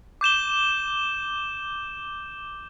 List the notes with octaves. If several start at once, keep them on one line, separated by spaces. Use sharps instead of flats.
D6 G6 E7 G7